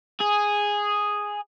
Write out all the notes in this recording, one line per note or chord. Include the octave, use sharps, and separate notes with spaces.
G#4